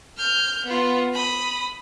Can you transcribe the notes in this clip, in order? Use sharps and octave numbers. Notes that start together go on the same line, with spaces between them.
F6 G6
B3 F4
B5 D#6